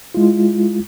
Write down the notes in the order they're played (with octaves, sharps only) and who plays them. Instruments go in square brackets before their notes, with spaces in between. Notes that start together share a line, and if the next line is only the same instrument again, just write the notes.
[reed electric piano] G#3 E4 F4